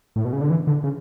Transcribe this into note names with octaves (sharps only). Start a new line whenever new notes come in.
A2
B2
C#3
D3
E3
D3
C#3